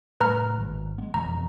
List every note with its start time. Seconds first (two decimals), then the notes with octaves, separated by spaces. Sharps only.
0.20 A2 G3 B4 A#5 F6
0.58 G#1
0.98 G#3 B3
1.14 E1 F2 A#5